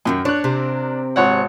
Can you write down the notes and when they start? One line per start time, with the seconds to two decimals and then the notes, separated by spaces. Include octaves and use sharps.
0.05 F#2 D#3 C#4 G5
0.25 D4 C#5 F#6
0.44 C3 C4 A#4
1.16 G#1 C#5 F#5